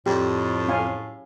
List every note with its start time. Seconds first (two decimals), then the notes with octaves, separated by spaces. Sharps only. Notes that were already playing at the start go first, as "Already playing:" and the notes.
0.06 F2 A2 G4
0.68 C#4 F5 G#5